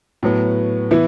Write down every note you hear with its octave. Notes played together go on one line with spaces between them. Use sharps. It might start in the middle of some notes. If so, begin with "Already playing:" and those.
A2 F#3 B3
E3 B3 E4